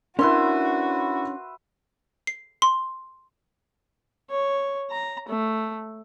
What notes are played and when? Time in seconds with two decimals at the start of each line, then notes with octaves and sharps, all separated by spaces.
0.19 C#4 D4 E4 F#4 A#4 B4 E5 C6
2.27 C7
2.62 C6
4.31 C#5
4.91 A#5
5.29 A3